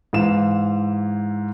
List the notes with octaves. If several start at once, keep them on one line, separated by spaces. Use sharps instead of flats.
G#2 E3 F5 E7